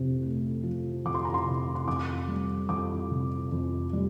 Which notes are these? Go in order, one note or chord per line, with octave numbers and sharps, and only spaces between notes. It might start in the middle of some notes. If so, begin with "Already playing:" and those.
Already playing: F2 C3
A3
F3
F2 D6
C6
A#5
C6
C3
C6
F2 D6
G3
F2 D6
C3
F2
G3